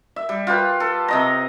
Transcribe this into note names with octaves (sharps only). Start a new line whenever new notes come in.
E5
G3
F4 G4 B4
A4
C3 D#5 A#5